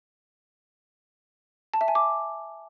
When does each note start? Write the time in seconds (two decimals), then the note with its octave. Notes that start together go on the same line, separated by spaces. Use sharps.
1.74 A5
1.81 E5
1.88 G#5
1.95 D6